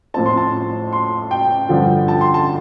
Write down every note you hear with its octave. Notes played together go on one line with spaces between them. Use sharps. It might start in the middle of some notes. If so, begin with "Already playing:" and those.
A2 F3 C4 A5
C6
A5
C6
G5
G2 D3 F3
A5
C6
A5